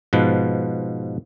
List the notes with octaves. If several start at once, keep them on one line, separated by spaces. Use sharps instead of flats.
G#2 B2 F3 B4